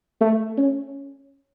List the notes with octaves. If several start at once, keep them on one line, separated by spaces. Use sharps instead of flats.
A3
C#4